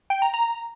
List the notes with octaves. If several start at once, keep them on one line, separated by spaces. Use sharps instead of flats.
G5
A#5
A#5